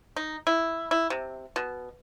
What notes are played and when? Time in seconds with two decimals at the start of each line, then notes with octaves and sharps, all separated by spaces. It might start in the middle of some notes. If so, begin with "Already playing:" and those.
0.16 D#4
0.47 E4
0.91 E4
1.10 C3
1.56 B2